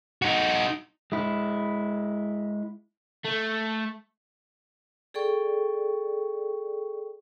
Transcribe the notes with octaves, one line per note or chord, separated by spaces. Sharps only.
D#4 F#4
G#3 E4
A3
G#4 A4 D5 G5 C#6